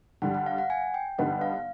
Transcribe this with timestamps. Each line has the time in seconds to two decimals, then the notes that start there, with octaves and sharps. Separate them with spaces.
0.22 G2 D3 G3 F#5
0.34 F#5
0.46 F5
0.58 F#5
0.70 G#5
0.94 G5
1.18 G2 D3 G3 B3 D#4 F#5
1.41 F5